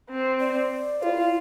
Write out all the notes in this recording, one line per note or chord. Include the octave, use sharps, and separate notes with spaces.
C4
D5
E4 F4